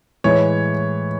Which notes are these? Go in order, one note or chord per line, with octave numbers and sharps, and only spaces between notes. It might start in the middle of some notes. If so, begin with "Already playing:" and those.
A2 E3 G#3 C#5